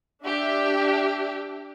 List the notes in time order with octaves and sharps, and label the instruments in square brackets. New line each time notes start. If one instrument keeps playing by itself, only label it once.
[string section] D4 G4 E5